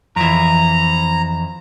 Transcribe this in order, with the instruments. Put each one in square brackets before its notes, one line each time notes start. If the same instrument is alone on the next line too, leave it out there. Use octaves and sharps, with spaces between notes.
[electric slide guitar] F2 E3 [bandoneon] A#5